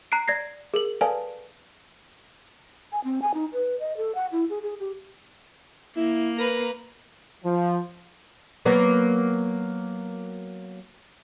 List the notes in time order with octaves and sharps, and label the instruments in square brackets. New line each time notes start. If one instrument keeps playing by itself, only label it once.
[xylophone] A#5 F#6 C7 D7
D5 G#6 A#6 C7
G#4 A#4 F#7
A4 B4 D5 F5 G#5 A5
[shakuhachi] G#5
C4
G#5
D#4
B4
D#5
A4
F#5
E4
G#4
G#4
G4
[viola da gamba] A#3 [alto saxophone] E4
[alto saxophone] A#4 [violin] B4 A#5
[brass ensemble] F3
[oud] F#3 A#3 B3